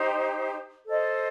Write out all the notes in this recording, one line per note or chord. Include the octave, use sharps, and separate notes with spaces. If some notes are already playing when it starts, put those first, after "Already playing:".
Already playing: D#4 G4 C5
A4 C5 D#5